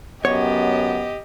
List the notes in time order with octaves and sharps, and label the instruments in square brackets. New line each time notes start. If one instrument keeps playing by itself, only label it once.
[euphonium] F#2 [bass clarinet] B3 [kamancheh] G4 D#5 [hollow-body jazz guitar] C#5